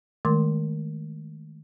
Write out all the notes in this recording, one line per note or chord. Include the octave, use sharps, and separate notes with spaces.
D#3 G#3 A3 A#4 C6 D6